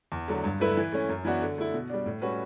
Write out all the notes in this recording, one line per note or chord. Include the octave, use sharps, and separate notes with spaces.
E2
D3 F#3 A3
G2
D3 A3 E4 B4
E3
A3 C#4
F#2
E3 B3 D4 F#4
D3
A3 E4
B2
G3 D4
A2
G3 C#4 F#4 B4